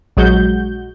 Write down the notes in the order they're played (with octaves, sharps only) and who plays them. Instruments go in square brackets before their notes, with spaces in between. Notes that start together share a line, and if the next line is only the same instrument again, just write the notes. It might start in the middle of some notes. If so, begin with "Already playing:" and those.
[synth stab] A#1 F#3 G#3 F#4 G6